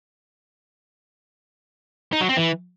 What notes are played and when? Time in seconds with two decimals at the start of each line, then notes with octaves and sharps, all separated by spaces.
2.13 D#4
2.21 F#3
2.29 C4
2.37 E3